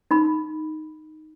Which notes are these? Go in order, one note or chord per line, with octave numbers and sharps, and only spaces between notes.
D#4 B5